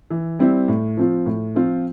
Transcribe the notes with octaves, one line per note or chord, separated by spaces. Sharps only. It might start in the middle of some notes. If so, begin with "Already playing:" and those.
E3
G3 C4 E4
A2
F3 C4 F4
A2
F3 C4 F4